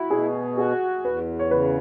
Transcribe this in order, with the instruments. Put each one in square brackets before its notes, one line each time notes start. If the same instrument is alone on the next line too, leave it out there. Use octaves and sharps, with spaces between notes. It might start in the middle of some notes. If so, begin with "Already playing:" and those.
Already playing: [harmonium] E4 [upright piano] F#4 E5
[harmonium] B2 [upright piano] G#4
[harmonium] F#4 [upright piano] G#4
[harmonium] E2 [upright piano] B4
[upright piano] C#5
[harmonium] C#3 [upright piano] B4